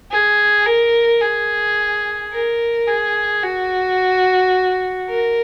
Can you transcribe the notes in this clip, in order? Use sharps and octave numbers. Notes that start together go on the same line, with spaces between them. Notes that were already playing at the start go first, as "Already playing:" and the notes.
G#4
A#4
G#4
A#4
G#4
F#4
A#4